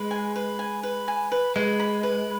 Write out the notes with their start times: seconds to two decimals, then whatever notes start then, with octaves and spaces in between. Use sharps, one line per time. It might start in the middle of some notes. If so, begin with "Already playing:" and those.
Already playing: G#3 B4
0.11 G#5
0.36 B4
0.59 G#5
0.83 B4
1.08 G#5
1.32 B4
1.56 G#3 B4
1.80 B5
2.03 B4